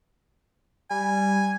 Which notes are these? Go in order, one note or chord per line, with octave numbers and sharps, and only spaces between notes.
G3 G#5